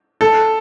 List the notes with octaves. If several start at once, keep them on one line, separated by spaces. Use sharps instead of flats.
A4